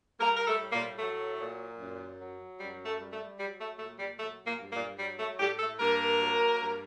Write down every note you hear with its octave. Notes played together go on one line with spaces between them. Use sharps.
G3 A#3 A#4
A#4
A3 A4
A2
A#2 A#3
F#3 A3
A#2
F#2
F#3
F#2 G3
A3
G3
A3
F#3 G3
A3
A#2 A3
G3
F#3 A3
A#2 A#3
G2
A#2 A#3
F#3 G3
A3
A2 G3 G4
A3 A4
G2 A#3 A#4
F#3
G2